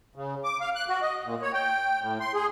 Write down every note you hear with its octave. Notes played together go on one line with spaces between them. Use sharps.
C#3
D6
F5
F#6
F#4
D#5
A#2
C#5
G5
A2
C6
G#4